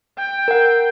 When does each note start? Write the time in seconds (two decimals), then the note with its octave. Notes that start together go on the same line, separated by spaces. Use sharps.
0.19 G5
0.48 A#4 F#5